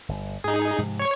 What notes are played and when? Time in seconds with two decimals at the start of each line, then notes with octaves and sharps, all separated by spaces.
0.09 G1
0.44 G#2 D#4 G#4
0.78 G#2 C3 F3
0.99 C#5 C#6